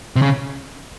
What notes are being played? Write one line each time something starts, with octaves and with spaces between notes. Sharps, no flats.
C3
C#3